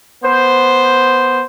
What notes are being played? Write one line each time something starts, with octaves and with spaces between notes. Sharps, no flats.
B3 C5